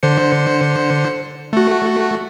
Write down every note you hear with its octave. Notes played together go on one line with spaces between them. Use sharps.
D3 C5 C#7
A3 F#4